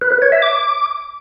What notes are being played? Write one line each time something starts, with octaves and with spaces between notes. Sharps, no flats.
B4
B4
C#5
E5
D6